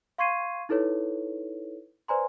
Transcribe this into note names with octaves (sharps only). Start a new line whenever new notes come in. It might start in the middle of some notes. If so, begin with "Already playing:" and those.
F5 C6 C#6 G#6 C7 D#7
D#4 E4 A4 B4 C#5
B4 C5 D5 G#5 A#5 C6